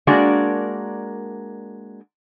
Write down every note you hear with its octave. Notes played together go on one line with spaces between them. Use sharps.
G#3 A#3 D4 F#4 A#4 D5